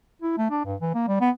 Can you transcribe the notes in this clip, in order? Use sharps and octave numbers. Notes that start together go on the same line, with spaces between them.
E4
A3
D4
G2
E3
A#3
G3
B3